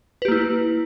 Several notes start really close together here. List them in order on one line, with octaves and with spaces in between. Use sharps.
B4 G4 A#3 E4